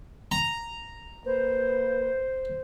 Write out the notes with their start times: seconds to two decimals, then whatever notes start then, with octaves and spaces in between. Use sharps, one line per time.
0.32 A#5
1.26 A#3 B4 C5